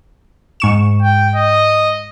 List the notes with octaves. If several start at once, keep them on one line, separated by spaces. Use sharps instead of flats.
G#2 C#6 E7
G5
D#5